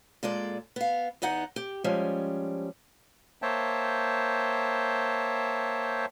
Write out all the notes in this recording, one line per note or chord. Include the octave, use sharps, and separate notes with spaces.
A#2 G#3 A4 D5
B3 F5
E2 B3 D#4 F#5
G4
F3 G3 G#3 C#4
A#3 C5 C#5 E5 G5 A5